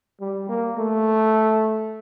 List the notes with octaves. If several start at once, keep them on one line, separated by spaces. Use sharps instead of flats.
G3
A#3
A3